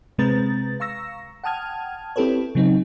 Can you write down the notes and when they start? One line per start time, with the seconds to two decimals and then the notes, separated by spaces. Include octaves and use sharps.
0.18 C3 G#3 C4 B4 A#5 A6
0.80 F5 A#5 C#6 E6 A#6
1.44 F#5 G5 A5 D#6 F6 G#6
2.16 C4 E4 G4 A4 B4 C#5
2.55 C#3 F#3 C4 D#4